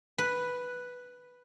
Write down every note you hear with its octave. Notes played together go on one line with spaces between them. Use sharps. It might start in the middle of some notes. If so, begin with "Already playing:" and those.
B4